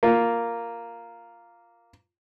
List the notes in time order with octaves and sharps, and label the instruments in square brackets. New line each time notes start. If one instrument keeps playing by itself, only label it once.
[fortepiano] A#3 F4